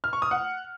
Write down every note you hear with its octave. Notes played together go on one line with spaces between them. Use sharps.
F6
C#6
D#6
F#5